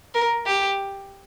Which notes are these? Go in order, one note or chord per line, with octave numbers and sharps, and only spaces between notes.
A#4
G4